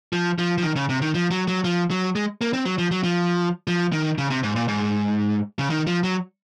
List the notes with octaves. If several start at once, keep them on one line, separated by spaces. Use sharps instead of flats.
F3
F3
F3
D#3
C#3
C3
D#3
F3
F#3
F#3
F3
F#3
G#3
A#3
C4
F#3
F3
F#3
F3
F3
D#3
C#3
C3
G#2
A#2
G#2
C#3
D#3
F3
F#3